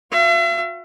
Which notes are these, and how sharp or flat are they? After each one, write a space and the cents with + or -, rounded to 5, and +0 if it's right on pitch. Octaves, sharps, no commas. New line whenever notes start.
F#4 -45 E5 +45